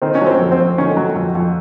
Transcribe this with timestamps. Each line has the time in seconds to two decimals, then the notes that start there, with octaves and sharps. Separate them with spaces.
0.02 D#3 C4
0.15 C#4
0.21 F#3
0.26 C4
0.39 F2
0.52 C4
0.59 F2
0.78 D#3 C#4
0.97 F#3
1.16 F2
1.35 F2